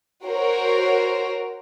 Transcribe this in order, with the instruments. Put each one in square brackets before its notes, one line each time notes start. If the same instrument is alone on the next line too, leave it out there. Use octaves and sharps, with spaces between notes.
[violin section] F#4 A#4 C5 C#5